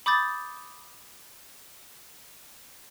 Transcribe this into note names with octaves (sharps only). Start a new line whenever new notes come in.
B5 D6 D#6 G6 A6